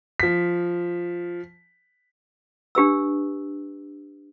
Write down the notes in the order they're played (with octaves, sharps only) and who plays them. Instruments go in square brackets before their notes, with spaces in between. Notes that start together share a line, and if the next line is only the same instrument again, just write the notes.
[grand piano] F3 B6
[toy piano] D4 G4 B4 E6